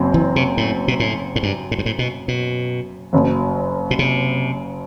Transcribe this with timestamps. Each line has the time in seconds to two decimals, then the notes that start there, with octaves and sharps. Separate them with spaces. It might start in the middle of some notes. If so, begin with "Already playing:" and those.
Already playing: F#1 F#2 F#3 C4
0.14 E3
0.36 C3
0.57 A2
0.88 B2
1.00 A2
1.36 A2
1.43 G2
1.71 A2
1.78 G2
1.86 A2
1.99 B2
2.28 B2
3.13 F#1 F#2 F#3
3.91 B2
3.99 C3